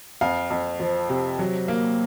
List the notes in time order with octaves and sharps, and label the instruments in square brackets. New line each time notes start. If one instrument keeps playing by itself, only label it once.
[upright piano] F2 F5
F2
F3
C3
F#3
A#3